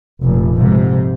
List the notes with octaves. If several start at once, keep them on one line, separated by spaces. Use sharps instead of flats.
F1 A#1
F2 G#2 C3